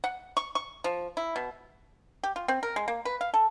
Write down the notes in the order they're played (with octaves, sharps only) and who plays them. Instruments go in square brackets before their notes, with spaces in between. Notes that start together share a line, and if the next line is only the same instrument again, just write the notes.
[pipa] F#5
C#6
C#6
F3
E4
B2
G4
F4
C4
A#4
G#3
A#3
B4
F5
A4